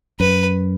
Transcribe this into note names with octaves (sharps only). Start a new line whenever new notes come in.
F#2 B4